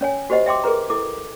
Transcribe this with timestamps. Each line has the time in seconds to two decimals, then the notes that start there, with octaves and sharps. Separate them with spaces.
0.01 C#4 C#5 G#5
0.30 F#4 G4 C5 D#5 F#5
0.46 E5 G5 C6 D6
0.64 G#4 A#4 B4 A#5
0.90 E4 A4 D6